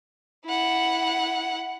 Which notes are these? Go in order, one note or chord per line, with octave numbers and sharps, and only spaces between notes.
E4 F#5